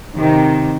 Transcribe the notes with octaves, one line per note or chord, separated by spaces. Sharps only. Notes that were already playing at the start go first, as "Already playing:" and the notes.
C3 D#3